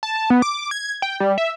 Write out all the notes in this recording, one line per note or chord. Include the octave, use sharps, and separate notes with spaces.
A5
B3
D6
G#6
G5
G3
E5